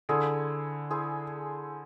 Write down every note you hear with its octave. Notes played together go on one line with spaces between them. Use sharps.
D3 E4 G#4 C5
E4 G#4 C5